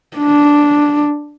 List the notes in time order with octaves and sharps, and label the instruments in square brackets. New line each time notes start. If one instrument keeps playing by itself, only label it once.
[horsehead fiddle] D4